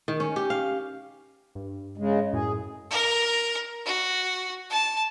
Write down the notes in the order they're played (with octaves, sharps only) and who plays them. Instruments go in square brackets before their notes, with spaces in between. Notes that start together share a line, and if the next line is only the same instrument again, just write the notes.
[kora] D#3
C#4
G4
F5
[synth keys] G2
[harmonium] C#3 G#3
[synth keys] F#2 A2 [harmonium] G#4
[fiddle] A#4
F#4
A5